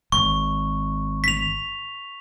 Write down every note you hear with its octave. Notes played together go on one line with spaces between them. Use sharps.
G#1 C#6
B6 F7